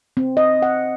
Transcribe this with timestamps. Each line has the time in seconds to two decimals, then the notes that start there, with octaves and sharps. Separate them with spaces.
0.17 C4
0.37 D#5
0.62 F#5